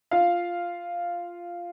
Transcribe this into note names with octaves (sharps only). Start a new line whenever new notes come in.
F4 F5